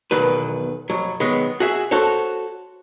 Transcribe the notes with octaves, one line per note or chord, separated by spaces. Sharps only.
B1 E2 D#3 B4
F2 F#3
D#3 F#3 G#3 B3
F#4 G#4 E5
F#4 A4 C5 C#5